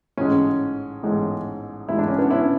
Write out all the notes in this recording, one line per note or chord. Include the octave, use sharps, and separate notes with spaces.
A1 G#2 G#3 C#4
A1 G#2 G#3
A1 G#2 G#3 E4
D4
C#4
B3 D4
C#4 E4